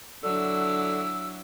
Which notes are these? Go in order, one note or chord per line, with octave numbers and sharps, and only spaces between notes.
D3 F#3 D4 E4 E6